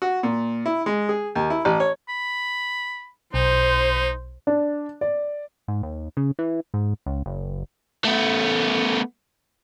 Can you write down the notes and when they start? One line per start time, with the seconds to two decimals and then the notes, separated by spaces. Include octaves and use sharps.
0.02 F#4
0.23 A#2
0.66 E4
0.86 G#3
1.09 G#4
1.35 D#2
1.50 E4
1.65 A1
1.80 C#5
2.09 B5
3.34 B1 D#4 C5
4.47 D4
5.01 D5
5.68 G#2
5.83 D#2
6.17 C#3
6.39 E3
6.74 G#2
7.06 C#2
7.26 F#1
8.05 A3 B3